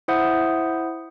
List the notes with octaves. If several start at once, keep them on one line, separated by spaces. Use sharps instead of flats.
E4 C5 E5 F#5 D#6 G6